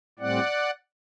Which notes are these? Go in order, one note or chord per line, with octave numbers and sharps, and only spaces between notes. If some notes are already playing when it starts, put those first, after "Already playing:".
A2 G3 C4 D5 F#5